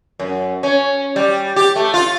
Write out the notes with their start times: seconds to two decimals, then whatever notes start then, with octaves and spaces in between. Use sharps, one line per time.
0.20 F#2
0.63 C#4
1.16 G3
1.56 G4
1.76 A3
1.94 F4